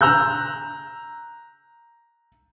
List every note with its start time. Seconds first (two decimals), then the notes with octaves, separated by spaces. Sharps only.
0.01 A#5 E6 F#6 G6